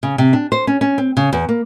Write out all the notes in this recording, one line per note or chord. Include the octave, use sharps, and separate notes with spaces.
C#3
C3
D4
C5
C#4
C#4
C4
C#3
E2
A#3